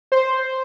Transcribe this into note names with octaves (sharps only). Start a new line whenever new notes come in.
C5